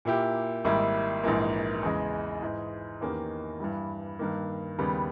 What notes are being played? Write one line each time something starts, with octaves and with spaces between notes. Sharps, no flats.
A#2 A#3 E4 G4
G#1 G#2 G3 A#3 E4
A#1 G#2 E3 A#3
E2 C#3 G#3
G#2 E3 G#3
E2 D#3 A#3 C#4 G4
G2 E3 G3
G2 D#3 A#3
D#2 C#3 G3 B3